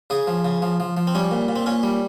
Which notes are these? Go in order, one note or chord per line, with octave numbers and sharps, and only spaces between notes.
C#3 G#4
F3
C#3
F3
F3
F3
C4
G3 C#4
A#2
A#2
C4
A#2 C#4
G3